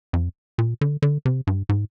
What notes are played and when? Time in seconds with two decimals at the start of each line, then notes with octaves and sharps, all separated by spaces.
0.13 F2
0.58 A#2
0.81 D3
1.02 D3
1.25 C3
1.47 G2
1.69 G#2